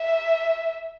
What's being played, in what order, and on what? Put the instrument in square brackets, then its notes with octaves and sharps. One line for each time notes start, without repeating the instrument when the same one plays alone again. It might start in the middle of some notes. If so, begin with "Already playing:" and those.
Already playing: [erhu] E5